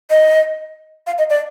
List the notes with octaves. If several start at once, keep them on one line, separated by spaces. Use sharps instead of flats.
D#5
F5
D#5
D5